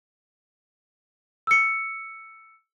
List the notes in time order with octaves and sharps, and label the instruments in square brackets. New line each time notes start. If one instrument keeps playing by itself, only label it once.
[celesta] E6 C#7